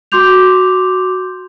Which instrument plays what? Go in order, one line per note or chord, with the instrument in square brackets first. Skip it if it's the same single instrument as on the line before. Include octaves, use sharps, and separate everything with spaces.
[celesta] F#4 C6 D6 G6 F7